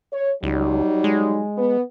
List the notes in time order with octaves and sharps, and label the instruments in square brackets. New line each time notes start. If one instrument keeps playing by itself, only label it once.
[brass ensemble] C#5
[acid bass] C#2 [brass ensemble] F#3 G3 D#4
[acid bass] G#3
[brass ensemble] B3